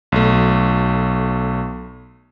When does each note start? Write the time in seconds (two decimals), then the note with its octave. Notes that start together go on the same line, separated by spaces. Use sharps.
0.12 B1 A3